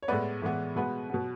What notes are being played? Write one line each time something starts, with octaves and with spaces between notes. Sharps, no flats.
C#5
A2 G#3 B3 B4 D5
A2 E3 G#3 B3
B2 G#3 B3 B4
B2 F#3 B3